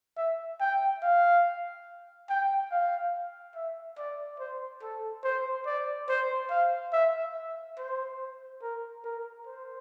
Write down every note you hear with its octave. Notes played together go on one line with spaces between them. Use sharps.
E5
G5
F5
G5
F5
E5
D5
C5
A4
C5
D5
C5
F5
E5
C5
A#4
A#4
C5